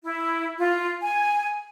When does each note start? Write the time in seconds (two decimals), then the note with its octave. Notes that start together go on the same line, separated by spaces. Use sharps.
0.03 E4
0.58 F4
1.02 G#5